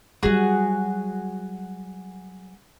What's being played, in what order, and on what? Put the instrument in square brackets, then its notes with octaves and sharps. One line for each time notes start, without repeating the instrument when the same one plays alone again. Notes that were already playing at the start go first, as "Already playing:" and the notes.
[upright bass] F#3 G3 [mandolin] F#4 G#4